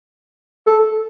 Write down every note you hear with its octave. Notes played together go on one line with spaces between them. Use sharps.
A4